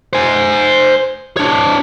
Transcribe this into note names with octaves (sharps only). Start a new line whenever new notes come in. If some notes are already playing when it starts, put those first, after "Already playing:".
C5 G#5
D4 C#5